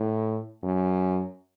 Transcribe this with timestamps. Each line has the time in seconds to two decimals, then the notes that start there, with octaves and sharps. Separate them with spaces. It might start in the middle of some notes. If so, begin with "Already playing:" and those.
Already playing: A2
0.63 F#2